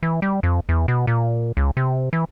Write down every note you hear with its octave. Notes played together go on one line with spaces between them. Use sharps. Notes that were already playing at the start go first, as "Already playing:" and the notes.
E3
G3
F2
E2
B2
A#2
C#2
C3
E3